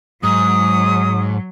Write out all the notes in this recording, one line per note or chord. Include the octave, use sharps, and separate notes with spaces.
G#2 F#3 D#6